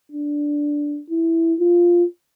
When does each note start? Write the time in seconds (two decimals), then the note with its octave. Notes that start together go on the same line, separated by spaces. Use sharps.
0.12 D4
1.10 E4
1.60 F4